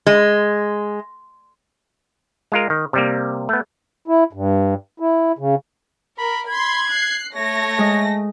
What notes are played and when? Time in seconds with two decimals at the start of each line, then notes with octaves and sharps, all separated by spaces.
0.07 G#3
2.52 G#3 F4 A#4
2.70 D#3
2.93 C3 G3 A#3
3.49 A3 B3
4.08 E4
4.33 G2
5.00 E4
5.39 C#3
6.18 A#4 B5
6.49 B5 C6 G#6
6.91 F#6 C7
7.35 A3 C#5 A#6
7.78 G#3 D#5